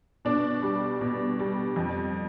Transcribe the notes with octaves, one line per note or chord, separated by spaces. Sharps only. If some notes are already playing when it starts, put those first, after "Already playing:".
B2 D4
G3
B2
G3
F2